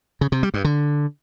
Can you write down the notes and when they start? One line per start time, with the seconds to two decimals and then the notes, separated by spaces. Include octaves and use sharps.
0.21 C#3
0.32 C3
0.43 G3
0.54 G2
0.64 D3